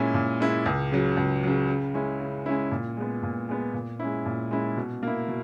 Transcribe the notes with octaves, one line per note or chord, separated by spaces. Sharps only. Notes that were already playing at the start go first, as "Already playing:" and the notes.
Already playing: A#2 G#3 C#4 E4
A#2
G#3 C#4 E4
C#2
C#3 F#3
C#2
C#3 F#3
C#3
G#3 C#4 E4
C#3
G#3 C#4 E4
A#2
G#3 B3
A#2
G#3 B3
A#2
G#3 C#4 E4
A#2
G#3 C#4 E4
B2
A#3 E4
B2